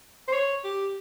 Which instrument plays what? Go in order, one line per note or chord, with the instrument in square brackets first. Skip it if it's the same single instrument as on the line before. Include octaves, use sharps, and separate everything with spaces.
[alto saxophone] C5
C#5
G4